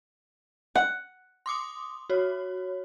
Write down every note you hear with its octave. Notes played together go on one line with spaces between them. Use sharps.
F#5
C6 D6 D#6
F#4 C#5